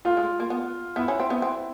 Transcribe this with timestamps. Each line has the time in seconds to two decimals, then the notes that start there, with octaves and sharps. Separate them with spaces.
0.05 A3 F4 F5
0.17 G#3
0.40 A#3
0.50 B3
0.96 B3 E4 E5
1.08 C#4
1.20 C4
1.30 B3
1.42 C4